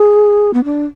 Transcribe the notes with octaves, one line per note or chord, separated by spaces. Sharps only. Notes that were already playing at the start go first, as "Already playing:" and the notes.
Already playing: G#4
B3
D4